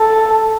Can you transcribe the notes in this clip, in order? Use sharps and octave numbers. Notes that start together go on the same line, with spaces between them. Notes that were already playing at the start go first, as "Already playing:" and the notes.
Already playing: A4